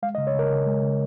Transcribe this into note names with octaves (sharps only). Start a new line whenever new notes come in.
G#3 F5
D#5
C#3
C#5
C#3 A#4
C#3
G#3
C#3